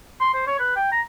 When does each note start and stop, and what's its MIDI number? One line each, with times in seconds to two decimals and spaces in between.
0.20 0.31 84
0.34 0.44 72
0.47 0.56 73
0.59 0.74 71
0.76 0.90 79
0.92 1.01 82